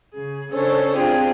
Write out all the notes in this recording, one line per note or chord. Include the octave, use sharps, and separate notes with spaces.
C#3 G#4
C#3 C#4 D4 A4 C5 C#5
C4 D4 F4 G4 G#4 C5